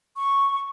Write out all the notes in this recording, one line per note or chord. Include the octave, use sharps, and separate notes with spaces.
C#6